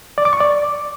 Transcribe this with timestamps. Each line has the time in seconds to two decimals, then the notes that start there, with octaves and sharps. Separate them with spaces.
0.18 D5
0.25 D6
0.33 C#6
0.40 D5